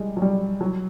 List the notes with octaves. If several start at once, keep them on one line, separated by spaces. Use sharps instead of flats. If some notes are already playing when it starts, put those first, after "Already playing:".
Already playing: G3 G#3
F#3
G3
F#3